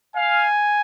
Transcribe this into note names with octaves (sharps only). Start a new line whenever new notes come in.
F5 G#5